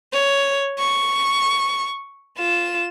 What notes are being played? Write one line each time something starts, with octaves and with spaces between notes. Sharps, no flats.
C#5
C#6
F4 E7